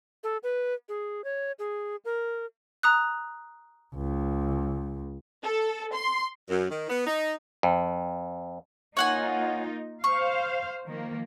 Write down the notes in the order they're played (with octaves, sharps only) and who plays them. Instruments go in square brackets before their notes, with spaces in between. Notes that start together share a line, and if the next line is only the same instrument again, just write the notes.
[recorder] A4
B4
G#4
C#5
G#4
A#4
[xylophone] A#5 D#6 F#6
[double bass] C#2
[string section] A4
C6
[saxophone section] F#2
D#3
B3
D#4
[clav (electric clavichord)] F2
[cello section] A#3 D#4 F4 [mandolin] C#5 F#5 G#5
[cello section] C5 F5 [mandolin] C#6
[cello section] D#3 F3 A#3